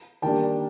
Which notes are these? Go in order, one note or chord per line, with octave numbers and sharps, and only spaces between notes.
D#3 G3 A#3 D4 G5 A5